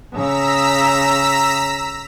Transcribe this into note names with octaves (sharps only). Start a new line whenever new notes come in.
C#3 A#5 E6 B6